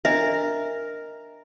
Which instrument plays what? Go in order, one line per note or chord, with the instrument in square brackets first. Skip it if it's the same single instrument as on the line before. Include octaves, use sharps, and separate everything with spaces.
[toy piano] D4 D#5 E5 [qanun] A#4